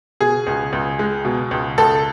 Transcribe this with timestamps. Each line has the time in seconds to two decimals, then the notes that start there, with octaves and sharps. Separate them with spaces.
0.21 B2 G#4
0.47 C#2
0.73 C#2
0.99 G#3
1.25 B2
1.51 C#2
1.78 C#2 A4